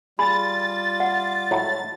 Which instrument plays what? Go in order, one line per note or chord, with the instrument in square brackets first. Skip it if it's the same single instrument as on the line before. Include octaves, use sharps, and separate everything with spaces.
[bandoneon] G3 F4 [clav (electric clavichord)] G#4 [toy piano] B5 [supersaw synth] A6
[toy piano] F#5
[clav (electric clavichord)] A2 F#3 [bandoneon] G#3 A3